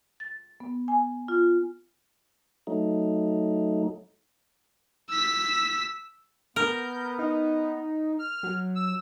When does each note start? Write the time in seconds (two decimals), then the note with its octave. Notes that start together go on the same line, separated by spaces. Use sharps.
0.20 A6
0.60 B3
0.88 G#5
1.28 F4
2.67 F#3 A3 D#4
5.09 E6 B6
6.56 B3 A#4 G6
7.19 D#4
8.19 F6
8.43 F#3
8.76 E6